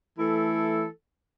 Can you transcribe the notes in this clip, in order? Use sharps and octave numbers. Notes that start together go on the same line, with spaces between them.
E3 A3 E4 A4